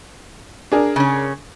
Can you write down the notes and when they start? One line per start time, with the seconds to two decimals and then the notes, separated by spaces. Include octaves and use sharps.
0.72 D4 G#4 A#4
0.96 C#3 C#4